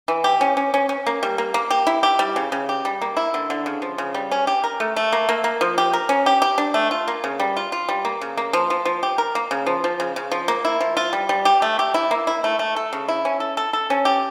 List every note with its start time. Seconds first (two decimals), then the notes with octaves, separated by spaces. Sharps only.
0.08 E3
0.24 G4
0.41 C#4
0.57 C#4
0.74 C#4
0.89 C#4
1.07 A#3
1.23 G3
1.38 A#3
1.54 A#3
1.71 G4
1.87 E4
2.03 G4
2.19 G3
2.36 C#3
2.52 C#3
2.69 G4
2.85 G3
3.02 A#3
3.17 E4
3.34 D3
3.50 D3
3.66 C#3
3.82 F3
3.98 C#3
4.14 G3
4.31 C#4
4.47 G4
4.64 A#4
4.80 A3
4.96 A3
5.12 A#3
5.29 A#3
5.44 A#3
5.61 F3
5.78 G4
5.93 A#4
6.09 C#4
6.26 G4
6.42 G4
6.58 D4
6.74 A3
6.91 F4
7.08 A#3
7.24 C#3
7.40 G3
7.56 F4
7.72 F4
7.89 G3
8.05 A#3
8.21 C#3
8.37 A#3
8.53 F3
8.70 F3
8.85 F3
9.03 G4
9.18 A#4
9.35 A#3
9.51 C#3
9.67 F3
9.84 F3
10.00 C#3
10.16 C#3
10.32 F3
10.48 A#3
10.65 E4
10.80 F3
10.97 F4
11.13 G3
11.29 G3
11.45 G4
11.62 A3
11.79 G4
11.94 E4
12.11 A#3
12.27 E4
12.44 A3
12.59 A3
12.76 A4
12.93 C#3
13.08 E4
13.25 C#4
13.40 A4
13.57 A4
13.73 A4
13.90 C#4
14.05 G4